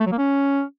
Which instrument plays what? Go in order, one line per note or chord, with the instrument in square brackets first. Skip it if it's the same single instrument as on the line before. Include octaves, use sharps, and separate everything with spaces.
[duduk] A3
F#3
A#3
C#4